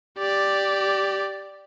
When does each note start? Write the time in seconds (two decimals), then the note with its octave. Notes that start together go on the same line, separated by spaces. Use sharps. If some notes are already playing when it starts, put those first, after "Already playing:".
0.18 G4 D5